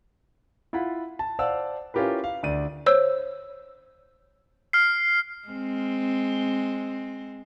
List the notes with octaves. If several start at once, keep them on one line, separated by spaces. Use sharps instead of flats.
E4 F4 F#5 B5
A5
C5 D5 F5 F#5 A5 E6
C#4 E4 F4 G4 A#4 B4
F5
D2 D5 D#7
C5 C#5 E6
F6 C7
G#3 C4